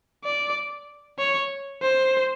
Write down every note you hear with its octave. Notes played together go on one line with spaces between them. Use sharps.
D5
C#5
C5